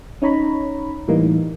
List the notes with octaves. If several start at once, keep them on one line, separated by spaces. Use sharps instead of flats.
C#4 D#4 C#5 A#5 B5
A2 E3 G3 A#3 D#4